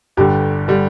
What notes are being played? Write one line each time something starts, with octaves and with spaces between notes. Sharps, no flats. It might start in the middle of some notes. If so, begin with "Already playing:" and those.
G1 G2 D3 G3 G4
D3 G3